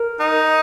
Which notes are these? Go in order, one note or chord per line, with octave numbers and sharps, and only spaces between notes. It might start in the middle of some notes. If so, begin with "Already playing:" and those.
Already playing: A#4
D#4